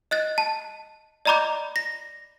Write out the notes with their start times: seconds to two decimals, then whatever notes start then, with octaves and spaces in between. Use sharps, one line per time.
0.11 D#5 F#6 A6
0.38 A5
1.25 D5 D#5 A#5 B5 D6 G6
1.76 A#6